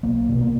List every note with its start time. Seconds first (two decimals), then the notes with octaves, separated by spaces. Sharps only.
0.03 B1 A#3
0.29 B2
0.41 A#3